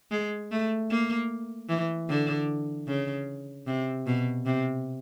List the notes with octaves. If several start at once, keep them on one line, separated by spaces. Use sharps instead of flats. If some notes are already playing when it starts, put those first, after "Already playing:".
G#3
A3
A#3
E3
D3
C#3
C3
B2
C3